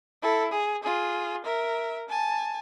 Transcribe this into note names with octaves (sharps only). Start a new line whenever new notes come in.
E4 A4
G#4
F4 G#4
A#4 E5
G#5 A5